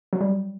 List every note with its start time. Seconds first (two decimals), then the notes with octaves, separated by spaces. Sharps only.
0.13 F#3
0.21 G3